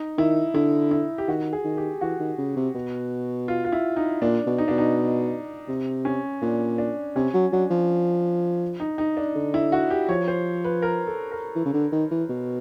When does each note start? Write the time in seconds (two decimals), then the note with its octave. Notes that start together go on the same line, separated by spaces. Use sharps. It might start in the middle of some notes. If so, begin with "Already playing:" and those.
Already playing: D#4
0.17 D#3 E4
0.54 D3 E4
0.91 E4
1.18 G4
1.28 D#3 F#4
1.53 G#4
1.65 D#3
1.77 G4
2.01 E3 F#4
2.20 D#3
2.38 C#3
2.56 C3
2.75 B2
3.48 F4
3.65 F4
3.72 E4
3.97 D#4
4.21 A#2 D4
4.46 B2
4.58 D#4
4.68 B2 D4
4.78 D#4
5.68 C3
6.05 C#4
6.42 A#2 D4
6.78 D4
7.16 C3 C#4
7.34 F#3
7.52 F#3 D4
7.70 F3
8.80 D#4
8.98 D#4
9.17 D4
9.36 D3
9.54 E4
9.72 F#4
9.90 G4
10.09 F3 C#5
10.28 C5
10.64 B4
10.82 A#4
11.07 A4
11.32 A#4
11.56 E3
11.65 C#3
11.74 D3
11.92 D#3
12.11 E3
12.30 B2